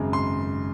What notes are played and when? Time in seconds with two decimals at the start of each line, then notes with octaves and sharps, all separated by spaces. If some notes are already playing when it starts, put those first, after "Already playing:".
Already playing: G#1 F#2 C#3 G#3
0.13 C6